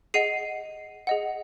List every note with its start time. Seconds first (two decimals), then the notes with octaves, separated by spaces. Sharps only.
0.14 G#4 D#5 F#5 C7 D#7
1.07 G#4 D#5 F#5